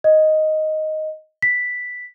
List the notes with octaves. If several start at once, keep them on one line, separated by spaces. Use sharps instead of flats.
D#5
B6